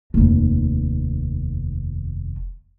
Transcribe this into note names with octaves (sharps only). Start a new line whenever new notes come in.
F1 D#2